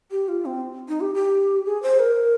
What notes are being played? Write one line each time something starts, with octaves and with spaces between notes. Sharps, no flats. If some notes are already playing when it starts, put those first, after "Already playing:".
G4
F4
C4
D#4
G4
G4
G#4
C5
A#4